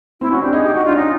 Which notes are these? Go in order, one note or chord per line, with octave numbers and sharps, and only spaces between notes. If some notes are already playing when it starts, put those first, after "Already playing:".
C4 E4
C#4 F#4
D4 G4
D#4 G#4
D#4 G4
D#4 F#4
D4 F4
C#4 D#4